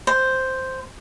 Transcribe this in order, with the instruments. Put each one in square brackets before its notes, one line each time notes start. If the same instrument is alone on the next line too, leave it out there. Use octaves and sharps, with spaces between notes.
[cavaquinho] C5